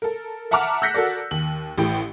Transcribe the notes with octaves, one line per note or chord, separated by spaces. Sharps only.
A4 A#4
E5 F#5 A5 A#5 D6 F6
E6 F#6 G6 A#6 B6 C#7
F#4 A4 A#4 D5
D#2 F#7
A1 A2 G4 G5